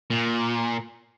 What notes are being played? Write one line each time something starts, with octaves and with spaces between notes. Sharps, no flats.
A#2